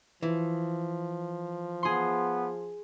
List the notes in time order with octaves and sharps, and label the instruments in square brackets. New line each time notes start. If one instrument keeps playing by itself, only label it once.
[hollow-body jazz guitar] E3 [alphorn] F3
[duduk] B3 [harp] G#4 C6